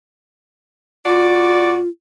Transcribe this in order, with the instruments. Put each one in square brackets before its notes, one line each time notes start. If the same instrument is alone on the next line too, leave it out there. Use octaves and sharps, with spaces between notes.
[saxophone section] E2 F#4 D5 [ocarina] F4